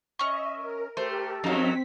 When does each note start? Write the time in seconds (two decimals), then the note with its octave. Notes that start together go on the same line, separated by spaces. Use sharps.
0.19 C#4 D#5 E5 C#6
0.53 A#4
0.97 A3 G4 A#4 C5
1.44 F2 F#3 C4 D#4 F5 B6